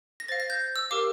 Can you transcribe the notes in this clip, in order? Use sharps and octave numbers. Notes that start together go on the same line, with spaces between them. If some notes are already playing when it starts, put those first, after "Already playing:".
A#6
C5 F5 A6
A#6
G6
E6
G4 A#4 F5 D6